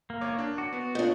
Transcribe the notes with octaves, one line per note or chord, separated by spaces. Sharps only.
A#3
G1 C#5 D6
D4
F#4 D6
B3
A#2 D4 C#5 D#5